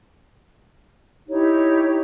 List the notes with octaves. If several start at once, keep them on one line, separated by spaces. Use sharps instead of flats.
D#4 E4 G4 C#5